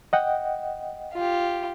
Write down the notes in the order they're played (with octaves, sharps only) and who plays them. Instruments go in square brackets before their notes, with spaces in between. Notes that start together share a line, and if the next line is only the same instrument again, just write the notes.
[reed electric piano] D#5 F#5 G5
[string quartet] F4 G4